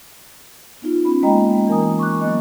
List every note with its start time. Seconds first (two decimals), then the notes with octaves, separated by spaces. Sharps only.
0.82 B3 D#4 F4
1.05 C#4 B5
1.23 G#3 A#3 C#4 D#5 G5 A#5
1.68 E3 A#4 G#5 A#5 D#6
1.99 C#6 D6 F#6
2.20 F#3 A#3 B3 D#5